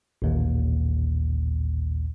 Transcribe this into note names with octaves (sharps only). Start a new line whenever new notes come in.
A1 D#2 A#2